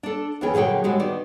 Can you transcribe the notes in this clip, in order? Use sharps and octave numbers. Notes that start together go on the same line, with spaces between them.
D4 A4
D2 E3 B3 C#4 G#4 G5
A#2 D3 F#3 G#4 G5
A2 G#3 F#4 G4
D#3 B3 D5